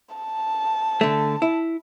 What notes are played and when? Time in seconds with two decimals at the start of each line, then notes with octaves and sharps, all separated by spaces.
0.15 A5
1.01 D3 A3
1.42 E4